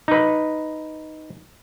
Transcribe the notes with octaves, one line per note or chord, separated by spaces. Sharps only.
D#4 B4